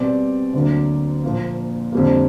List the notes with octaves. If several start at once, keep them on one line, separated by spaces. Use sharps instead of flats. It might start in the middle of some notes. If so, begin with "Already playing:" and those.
Already playing: B2 G3 C4 D5
D2 D3 F#3 A#3
A#2 F3 A#3
F2 D3 G3 A#3